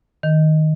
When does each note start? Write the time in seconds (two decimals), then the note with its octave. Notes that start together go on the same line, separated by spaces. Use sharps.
0.23 D#3